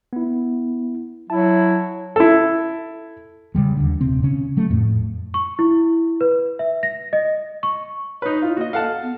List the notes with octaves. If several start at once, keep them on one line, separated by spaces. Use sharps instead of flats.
B3 E4
F#3 E4 A5
E4 A4
C#3 E3 G3 G#3
D#2 D3
D#1 C3 C4
C#3 C#4
F#3 A3
F2 A2
C#6
E4
B4
E5
A#6
D#5
C#6
D#4 B4 C#5
E4 F4
A#3 F#4 D#5
A4 F5 F#5 A5
B3